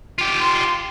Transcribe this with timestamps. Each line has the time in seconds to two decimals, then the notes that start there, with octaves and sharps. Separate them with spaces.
0.18 F4 G4
0.41 C6